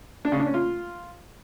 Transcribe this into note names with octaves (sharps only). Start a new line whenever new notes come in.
D4
C#3
D4
C#4
F4